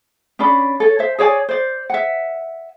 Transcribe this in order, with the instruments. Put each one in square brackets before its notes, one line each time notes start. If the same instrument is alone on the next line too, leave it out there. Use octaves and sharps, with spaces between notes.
[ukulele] C#4 D4 D5 B5
A4 C#5
C5 E5
G#4 C#5 D5 G#5
C5 D5
E5 F#5